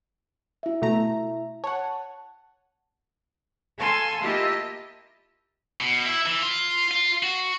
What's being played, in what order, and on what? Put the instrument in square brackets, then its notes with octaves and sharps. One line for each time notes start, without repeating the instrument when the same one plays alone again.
[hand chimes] E4 E5
[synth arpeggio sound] B2 A3 A#5
[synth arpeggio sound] C#5 F#5 [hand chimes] A5
[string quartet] A4 F5 G#5 A5 C6 E6
A#3 E4 F4 G4 D#5 A5
[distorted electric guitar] B2
E4
E3
F4
F4
F#4